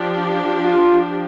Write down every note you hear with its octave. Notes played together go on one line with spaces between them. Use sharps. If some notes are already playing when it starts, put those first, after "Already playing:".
Already playing: F3 D4 G4
F4